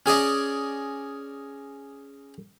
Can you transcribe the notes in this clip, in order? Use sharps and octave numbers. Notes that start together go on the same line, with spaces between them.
C#4 G#4 D5 D#5